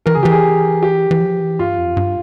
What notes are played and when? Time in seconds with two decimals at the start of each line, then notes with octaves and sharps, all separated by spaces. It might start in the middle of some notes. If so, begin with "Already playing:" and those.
0.06 E3 A#4
0.15 C#3 G#4
0.23 E3 G4
0.31 G#4
0.83 G4
1.11 E3
1.20 F3
1.40 E3
1.59 G2 F4
1.78 F2
1.97 G2